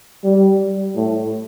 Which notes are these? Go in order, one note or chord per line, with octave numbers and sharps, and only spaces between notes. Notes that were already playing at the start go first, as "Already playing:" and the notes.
G3
A2